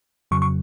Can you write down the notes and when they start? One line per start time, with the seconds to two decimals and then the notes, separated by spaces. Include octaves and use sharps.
0.31 F2 C#3 F#3 C#6
0.42 C#6